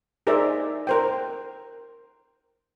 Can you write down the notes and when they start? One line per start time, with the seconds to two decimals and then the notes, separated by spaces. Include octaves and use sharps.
0.27 D#4 G#4 A#4 C5 D5 E5
0.87 A#4 C5 G5